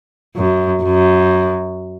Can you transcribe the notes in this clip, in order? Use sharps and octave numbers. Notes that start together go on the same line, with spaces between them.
F#2
F#2